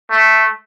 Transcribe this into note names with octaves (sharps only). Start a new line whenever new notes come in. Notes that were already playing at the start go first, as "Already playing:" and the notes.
A3